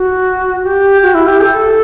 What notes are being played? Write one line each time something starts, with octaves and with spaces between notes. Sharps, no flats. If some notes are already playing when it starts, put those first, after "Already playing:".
Already playing: F#4
G4
F#4
E4
G4
A4